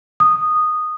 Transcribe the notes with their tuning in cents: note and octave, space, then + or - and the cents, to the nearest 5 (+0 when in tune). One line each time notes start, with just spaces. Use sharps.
D#6 -10